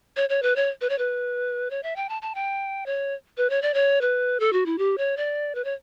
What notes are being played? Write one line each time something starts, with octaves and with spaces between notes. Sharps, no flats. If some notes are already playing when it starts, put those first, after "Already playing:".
C#5
C#5
B4
C#5
B4
C#5
B4
C#5
E5
G5
A5
A5
G5
C#5
B4
C#5
D5
C#5
B4
A4
F#4
E4
G4
C#5
D5
B4
C#5